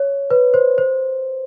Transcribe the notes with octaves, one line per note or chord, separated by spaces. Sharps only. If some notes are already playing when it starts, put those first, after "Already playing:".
Already playing: C#5
B4
C5
C5